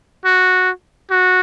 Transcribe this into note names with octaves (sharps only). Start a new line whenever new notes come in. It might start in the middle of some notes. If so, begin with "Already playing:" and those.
F#4
F#4